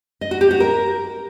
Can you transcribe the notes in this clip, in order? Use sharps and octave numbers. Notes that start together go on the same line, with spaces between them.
D#5
F#4
G4
F#4
A#4